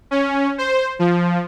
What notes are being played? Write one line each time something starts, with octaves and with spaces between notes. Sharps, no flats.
C#4
C5
F3